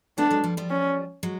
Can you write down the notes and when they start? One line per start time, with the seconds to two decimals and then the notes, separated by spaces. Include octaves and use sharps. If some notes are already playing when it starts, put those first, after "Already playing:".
0.18 A3 B3 D4
0.31 F#3 G#3
0.44 F3 G3
0.57 F3 G3
0.70 C#4
1.23 F#3 G#3